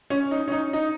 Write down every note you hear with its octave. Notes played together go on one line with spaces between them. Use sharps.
C#4
D#4
C#4
D#4
D#4